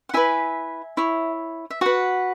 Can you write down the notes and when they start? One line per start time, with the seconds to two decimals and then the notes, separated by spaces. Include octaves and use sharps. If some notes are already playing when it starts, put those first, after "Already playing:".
0.09 F#5
0.14 E4 B4 E5 G#5
0.97 E4 C#5
1.70 E5
1.81 F#4 B4 F#5